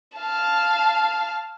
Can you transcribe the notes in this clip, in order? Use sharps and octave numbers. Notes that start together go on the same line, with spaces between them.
F5 A5